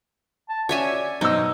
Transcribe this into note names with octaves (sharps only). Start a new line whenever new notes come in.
A5
C#4 F#4 C#5 D5 E5 G#5
F#2 B2 D#4 C5 E6